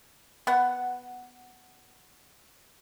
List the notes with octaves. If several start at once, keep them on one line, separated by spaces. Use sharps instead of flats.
B3 F#5